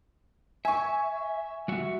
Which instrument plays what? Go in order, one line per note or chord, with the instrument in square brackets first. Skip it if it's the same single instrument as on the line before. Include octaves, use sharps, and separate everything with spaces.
[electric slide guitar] E5 [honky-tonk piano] G#5 C#6
[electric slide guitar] G3 F#4 E5